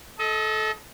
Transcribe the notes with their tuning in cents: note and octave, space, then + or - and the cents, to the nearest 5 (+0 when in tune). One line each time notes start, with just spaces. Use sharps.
A4 -20 D#5 +25